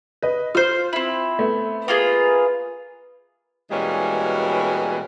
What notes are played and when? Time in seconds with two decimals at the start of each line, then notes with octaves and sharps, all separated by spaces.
0.22 B4 D#5
0.55 F4 C5 F6
0.93 C4 E4
1.39 A3 B3
1.88 A#3 F4 G#4 B4
3.71 B2 E3 G3 G#3 A#3 C#4